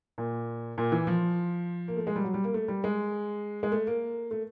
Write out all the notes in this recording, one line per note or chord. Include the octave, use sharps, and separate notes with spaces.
A#2
A#2
E3
F3
A#3
A3
G#3
G3
F#3
G3
A#3
A3
G3
G#3
G#3
A3
A#3
A3